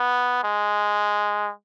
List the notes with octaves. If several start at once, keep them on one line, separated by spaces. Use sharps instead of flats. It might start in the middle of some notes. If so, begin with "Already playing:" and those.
Already playing: B3
G#3